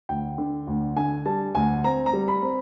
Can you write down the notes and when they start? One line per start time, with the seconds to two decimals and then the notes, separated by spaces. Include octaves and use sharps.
0.09 D2 G5
0.38 D3
0.67 D2
0.96 D3 G#5
1.25 G3 A5
1.55 D2 G#5
1.84 C4 A#5
2.06 A#5
2.13 G3
2.28 B5
2.42 C4